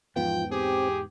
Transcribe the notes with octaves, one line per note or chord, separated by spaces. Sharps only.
E2 G#2 F3 B3 F4 G5
C4 G4 G#4